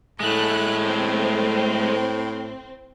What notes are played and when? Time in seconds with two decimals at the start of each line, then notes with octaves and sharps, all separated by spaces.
0.20 A2 G#3 A3 F#6
0.83 C4